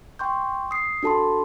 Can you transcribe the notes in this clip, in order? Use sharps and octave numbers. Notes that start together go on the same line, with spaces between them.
G5 C6 C#6 G6
D#6 C7
D4 F#4 A4 A5 B5 C6